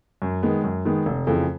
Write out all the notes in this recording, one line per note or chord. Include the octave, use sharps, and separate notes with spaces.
F#2
D#3 G#3 B3
F#2
D#3 G#3 B3
F1
F2 C#3 E3 A3